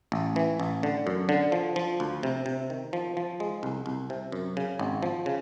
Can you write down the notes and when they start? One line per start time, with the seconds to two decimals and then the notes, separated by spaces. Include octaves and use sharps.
0.12 A1
0.36 E3
0.60 A1
0.83 D3
1.07 F#2
1.29 D3
1.52 F3
1.76 F3
2.00 D2
2.23 C3
2.46 C3
2.70 D#3
2.93 F3
3.17 F3
3.40 G#3
3.63 C2
3.86 C2
4.10 C3
4.32 F#2
4.57 C#3
4.79 G#1
5.03 F3
5.26 C#3